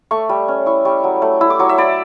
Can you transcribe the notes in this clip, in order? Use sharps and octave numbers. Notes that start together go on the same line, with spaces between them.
A3 C#6
G3
C#4
E4 C#6
G3 C#6
F#3
A3
E4 E6
D6
F#3 C#6
E5
E4 D5